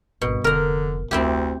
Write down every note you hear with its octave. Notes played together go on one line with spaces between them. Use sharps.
G#1 G2 B2
F1 D3 A#4 A#5
F1 D2 C4 E4 G4